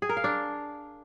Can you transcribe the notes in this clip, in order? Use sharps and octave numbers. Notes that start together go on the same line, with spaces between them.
G#4
A#4
F5
D4